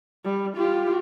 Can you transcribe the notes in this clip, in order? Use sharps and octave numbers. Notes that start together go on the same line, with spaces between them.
G3
F4 G4